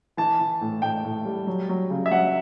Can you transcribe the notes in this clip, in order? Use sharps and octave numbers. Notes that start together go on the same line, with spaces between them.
E3 A5
E3
A2
A2 G5
A2
G3
F#3
F#3
C#3
E5
F#3 F#5